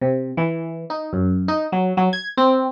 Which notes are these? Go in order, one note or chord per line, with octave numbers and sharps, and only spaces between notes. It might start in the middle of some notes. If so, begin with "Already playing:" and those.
C3
E3
D#4
F#2
D#4
F#3
F#3
G#6
C4